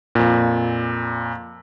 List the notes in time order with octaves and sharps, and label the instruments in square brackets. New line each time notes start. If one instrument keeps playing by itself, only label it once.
[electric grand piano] F2 A#2